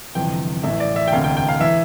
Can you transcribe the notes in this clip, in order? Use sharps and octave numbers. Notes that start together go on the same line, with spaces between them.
G1 F2 C3 E3 G5
A1 A2 E3 E5
D5
E5
G5
E1 D2 C3 F5
G5
G5
F5
E3 E5